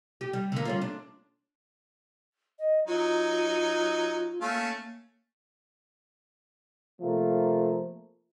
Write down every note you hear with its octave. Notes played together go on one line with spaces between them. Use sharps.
G4
G3
D3 A#3
G3 C#4 F4
D4
D#5
F#3 D#4 F4
A3 A#3 C#4 F5
C3 F3 A3 A#3